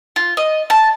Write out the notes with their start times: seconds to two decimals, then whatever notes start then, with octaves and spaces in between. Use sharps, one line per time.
0.16 F4
0.37 D#5
0.70 A5